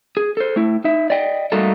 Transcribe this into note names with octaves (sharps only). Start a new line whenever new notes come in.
G#4
A4 C5
A3 E4
D#4 E5
D5 D#5 G5
G3 A3 A#3 D#4 F#4 A4